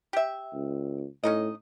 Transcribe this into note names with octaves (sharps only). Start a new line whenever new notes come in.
G4 E5
C#2
A2 C#4 D#4 D#5